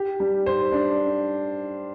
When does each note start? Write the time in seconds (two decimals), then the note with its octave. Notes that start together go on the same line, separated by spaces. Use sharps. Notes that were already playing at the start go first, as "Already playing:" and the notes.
Already playing: G4
0.20 G3
0.46 C5
0.72 D4